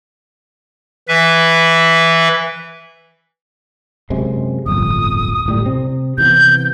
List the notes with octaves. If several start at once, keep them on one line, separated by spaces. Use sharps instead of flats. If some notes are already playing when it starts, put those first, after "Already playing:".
E3 B4 E5
F#2 C3 G#3
D1 G1 F2 D#6
D1 A2 G3
C3 C4
C3 E3 B3 G6